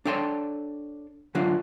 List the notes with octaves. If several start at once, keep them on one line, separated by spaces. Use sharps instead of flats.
D4 A4 C#5 G5 A5 C6
D3 F#3 D4 F4